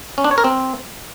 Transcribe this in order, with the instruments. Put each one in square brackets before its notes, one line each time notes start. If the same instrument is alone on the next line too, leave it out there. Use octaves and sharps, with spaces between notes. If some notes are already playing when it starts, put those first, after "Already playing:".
[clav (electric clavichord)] C#4
D4
C#5
A#4
C4